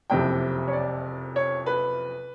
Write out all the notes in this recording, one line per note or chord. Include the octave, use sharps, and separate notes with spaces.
F#1 F2 C3 E3 G5
C#5
D5
C#5
B4